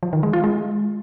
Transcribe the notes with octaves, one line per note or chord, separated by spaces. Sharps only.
F3
D#3
G#3
F4
G#3